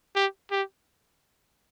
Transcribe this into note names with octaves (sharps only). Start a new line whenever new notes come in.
G4
G4